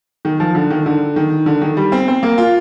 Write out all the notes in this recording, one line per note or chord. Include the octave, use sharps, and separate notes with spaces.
D#3
F3
D3
D#3
D3
D#3
D3
D#3
G3
C4
C4
A#3
F4